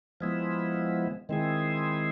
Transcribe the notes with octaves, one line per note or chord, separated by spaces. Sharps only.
F3 G#3 B3 E4
D#3 G#3 C4 E4 G#4